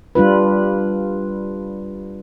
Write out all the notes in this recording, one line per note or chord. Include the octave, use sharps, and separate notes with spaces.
G3 D4 F4 B4